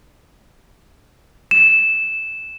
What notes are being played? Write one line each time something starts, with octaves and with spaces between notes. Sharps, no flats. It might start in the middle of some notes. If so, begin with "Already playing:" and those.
E7